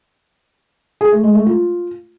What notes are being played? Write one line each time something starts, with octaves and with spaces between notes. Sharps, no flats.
G#4
A3
G#3
A3
F4